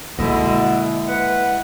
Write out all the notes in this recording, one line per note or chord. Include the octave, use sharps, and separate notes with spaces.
B2 D3 G#3 A#3 E4 D#5
B4 F#5